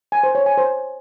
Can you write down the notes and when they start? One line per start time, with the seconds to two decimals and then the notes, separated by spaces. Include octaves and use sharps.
0.12 G#5
0.23 C5
0.35 C#5
0.46 G#5
0.58 C5